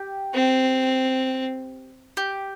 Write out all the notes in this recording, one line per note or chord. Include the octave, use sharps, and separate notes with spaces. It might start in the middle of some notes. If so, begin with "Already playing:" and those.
Already playing: G4
C4
G4